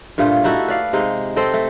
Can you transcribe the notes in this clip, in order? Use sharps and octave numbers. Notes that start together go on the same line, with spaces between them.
G2 A#2 A3 F4
D#4 E4 F#4 A4
B4 D5 F5
C3 G#3 D#4
C4 A4 D#5 G5
A3